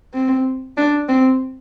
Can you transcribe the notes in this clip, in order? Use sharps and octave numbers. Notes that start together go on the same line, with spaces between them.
C4
D4
C4